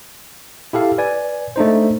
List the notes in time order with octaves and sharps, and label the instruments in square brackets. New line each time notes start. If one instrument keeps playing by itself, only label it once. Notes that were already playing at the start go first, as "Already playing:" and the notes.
[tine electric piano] E4 G4 A4 F5
B4 D5 G#5
A3 D4 D#4 C5